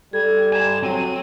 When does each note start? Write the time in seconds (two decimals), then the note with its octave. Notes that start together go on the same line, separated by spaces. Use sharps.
0.13 G3 A4 G#6
0.53 G#5 A#5 G#6 E7
0.83 F#3 C4 D#7